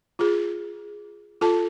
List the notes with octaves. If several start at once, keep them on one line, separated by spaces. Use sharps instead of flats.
F4 G#4
F4 A4 A5